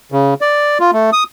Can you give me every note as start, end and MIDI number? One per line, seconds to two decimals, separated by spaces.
0.12 0.34 49
0.41 0.78 74
0.80 0.91 65
0.93 1.10 57
1.13 1.24 87